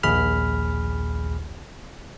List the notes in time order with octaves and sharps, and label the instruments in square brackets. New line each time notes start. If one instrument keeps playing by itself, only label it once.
[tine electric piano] A#1 D#2 G#4 B5 F6